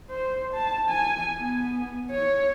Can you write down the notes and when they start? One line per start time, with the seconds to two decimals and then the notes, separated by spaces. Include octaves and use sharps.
0.10 C5
0.54 A5
0.90 G#5
1.38 B3
2.11 C#5